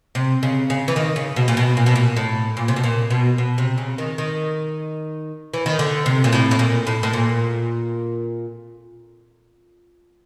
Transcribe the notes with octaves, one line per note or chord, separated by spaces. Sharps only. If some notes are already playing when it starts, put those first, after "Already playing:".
C3
C#3
C#3
E3
D#3
C#3
B2
A#2
B2
A#2
B2
A#2
A2
A#2
C3
B2
A#2
B2
B2
C3
C#3
D#3
D#3
E3
D#3
D3
C3
A#2
A2
A2
A#2
A2
A2
A#2